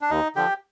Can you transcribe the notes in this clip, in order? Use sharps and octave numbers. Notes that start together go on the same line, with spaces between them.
D4
D#2 D#4
D3 F3 G4